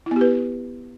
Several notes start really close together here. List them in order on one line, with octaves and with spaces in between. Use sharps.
E4 B3 G4 B4